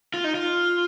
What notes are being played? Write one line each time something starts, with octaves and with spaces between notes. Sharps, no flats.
F4
D#4
F4